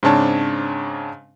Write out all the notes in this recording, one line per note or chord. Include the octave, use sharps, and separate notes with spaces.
G#2 C#3 C4 D4 C#5 A5